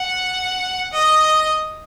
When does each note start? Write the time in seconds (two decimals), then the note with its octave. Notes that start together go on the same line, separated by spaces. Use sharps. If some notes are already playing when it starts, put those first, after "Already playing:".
Already playing: F#5
0.93 D#5